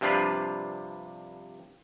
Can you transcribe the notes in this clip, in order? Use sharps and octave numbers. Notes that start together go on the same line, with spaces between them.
G2 C3 F3 D4 F4 B4